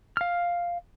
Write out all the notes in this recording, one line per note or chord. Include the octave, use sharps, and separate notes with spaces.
F5 F6